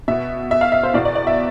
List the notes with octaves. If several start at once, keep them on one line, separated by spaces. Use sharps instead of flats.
B2 B3 E5
E5
F5
E5
C5
E2 B2 B3 D5
D5
D5
E5